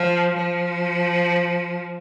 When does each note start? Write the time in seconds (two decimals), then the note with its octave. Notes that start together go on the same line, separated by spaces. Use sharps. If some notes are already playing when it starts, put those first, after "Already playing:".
Already playing: F3
0.36 F3